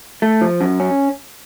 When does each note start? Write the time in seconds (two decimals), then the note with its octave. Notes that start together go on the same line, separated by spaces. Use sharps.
0.22 A3
0.41 F3
0.61 F#2
0.80 C#4